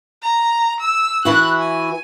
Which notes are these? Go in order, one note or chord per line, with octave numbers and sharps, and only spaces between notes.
A#5
E6
E3 E4 F#4 F#6
G#5